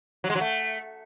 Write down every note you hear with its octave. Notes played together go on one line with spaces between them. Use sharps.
F#3
G#3
F#3
A3